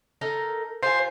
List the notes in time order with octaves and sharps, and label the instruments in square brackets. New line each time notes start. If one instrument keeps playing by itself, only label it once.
[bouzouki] D#4 A4 A#4
[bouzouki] F4 G4 G#5 [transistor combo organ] C5